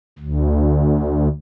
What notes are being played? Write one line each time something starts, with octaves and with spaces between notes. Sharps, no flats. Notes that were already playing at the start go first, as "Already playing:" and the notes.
D2